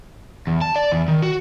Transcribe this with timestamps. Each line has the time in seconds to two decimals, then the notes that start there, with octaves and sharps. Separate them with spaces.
0.47 E2
0.62 A5
0.76 D5
0.92 E2
1.08 D#3
1.22 F#4